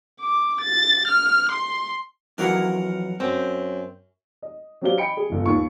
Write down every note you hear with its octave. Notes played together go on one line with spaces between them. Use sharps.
D6
A6
F6
C6
F2 E3 F#3 A#4 F#5
F#2 C4
D#5
F#3 C4 D4 G4 F5 G7
D#5 G5 B5 C#7 D7
G#4
G1 C#2
D#2 C#6